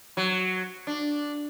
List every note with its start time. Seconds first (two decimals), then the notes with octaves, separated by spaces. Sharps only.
0.17 F#3
0.87 D4